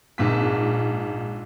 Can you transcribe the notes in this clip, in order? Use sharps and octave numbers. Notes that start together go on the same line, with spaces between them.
A#1 G#2 B6